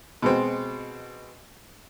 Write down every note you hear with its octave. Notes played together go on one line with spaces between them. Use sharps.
B2 G#3 C4